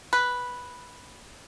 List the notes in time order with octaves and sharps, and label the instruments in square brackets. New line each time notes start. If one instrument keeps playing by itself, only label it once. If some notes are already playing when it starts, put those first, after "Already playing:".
[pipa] B4